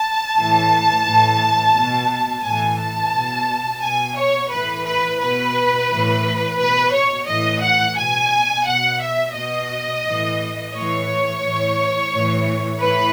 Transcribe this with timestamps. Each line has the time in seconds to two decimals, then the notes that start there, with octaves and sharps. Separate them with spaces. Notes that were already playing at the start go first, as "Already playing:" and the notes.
Already playing: A5
0.36 A2 E3
1.05 A2 E3
1.74 B2
2.43 A2 E3 G#5
2.78 A5
3.13 B2
3.82 B2 G#5
4.17 C#5
4.51 A2 E3 B4
4.86 B4
5.20 B2 B4
5.90 A2 E3
6.59 B2 B4
6.93 C#5
7.28 A2 E3 D#5
7.62 F#5
7.97 B2 G#5
8.67 B2 F#5
9.01 E5
9.35 B2 D#5
10.05 A2 E3
10.74 A2 E3 C#5
11.42 A2 E3
12.12 A2 E3
12.81 A2 E3 B4